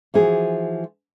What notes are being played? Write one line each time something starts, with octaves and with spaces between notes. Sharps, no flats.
E3 F3 F#4 G#4